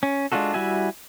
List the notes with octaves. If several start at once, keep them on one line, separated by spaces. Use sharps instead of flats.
C#4
G#3 D4 F4 F#4 A4
G3 E4 F#4 E5 G#5